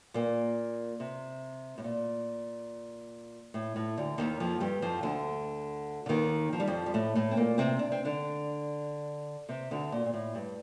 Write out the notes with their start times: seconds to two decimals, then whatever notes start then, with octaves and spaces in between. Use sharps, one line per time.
0.14 A#2 A#3
1.00 C3
1.78 A2
1.84 A#2
3.54 A2
3.76 A2
3.97 D2 D3
4.18 D#2 D#3
4.40 F2 F3
4.60 G2 G3
4.82 F2 F3
5.03 D2 D3
6.06 D3
6.09 D#2 D#3
6.53 F3
6.60 G3
6.67 F2 F3
6.86 G3
6.94 A2 A3
7.15 A2 A3
7.31 C4
7.37 A#2 A#3
7.58 C3 C4
7.79 D4
7.92 C4
8.05 D3 D4
9.49 C3 C4
9.71 D2 D3
9.92 A#2
10.06 A#2
10.14 A2
10.35 G2